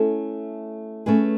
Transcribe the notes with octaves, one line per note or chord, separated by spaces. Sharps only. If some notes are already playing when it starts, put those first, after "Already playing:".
Already playing: A3 C#4 E4 A4
A3 C#4 G#4 B4